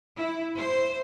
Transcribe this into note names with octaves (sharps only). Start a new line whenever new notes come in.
E4
C5